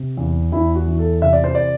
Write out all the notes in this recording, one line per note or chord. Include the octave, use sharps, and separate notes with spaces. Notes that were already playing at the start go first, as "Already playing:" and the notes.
Already playing: C3
E2
E2 E4
F#4
E3
A4
C3 E5
D5
C5
D5